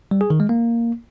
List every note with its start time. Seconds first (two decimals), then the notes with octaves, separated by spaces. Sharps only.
0.11 G3
0.21 G#4
0.30 D#3
0.40 G#3
0.49 A#3